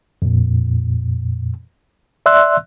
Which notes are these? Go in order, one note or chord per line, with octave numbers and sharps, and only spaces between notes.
F2 A#2
D5 E5 C6 E6 F#6